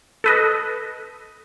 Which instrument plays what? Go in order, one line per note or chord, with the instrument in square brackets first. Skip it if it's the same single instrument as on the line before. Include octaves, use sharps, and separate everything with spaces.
[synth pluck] A4 B4 D#5